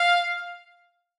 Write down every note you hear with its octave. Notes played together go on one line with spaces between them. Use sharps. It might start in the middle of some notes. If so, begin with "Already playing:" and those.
Already playing: F5